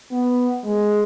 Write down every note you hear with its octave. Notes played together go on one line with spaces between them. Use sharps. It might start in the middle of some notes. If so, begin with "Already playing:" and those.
B3
G#3